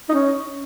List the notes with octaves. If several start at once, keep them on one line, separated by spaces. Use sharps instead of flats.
D#4
C#4